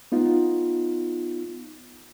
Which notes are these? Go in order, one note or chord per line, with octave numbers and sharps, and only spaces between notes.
B3 D#4 F4